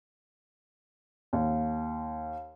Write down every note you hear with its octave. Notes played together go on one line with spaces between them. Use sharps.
D#2